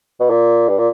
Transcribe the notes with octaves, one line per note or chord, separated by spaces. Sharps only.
B2
A#2
G2
A#2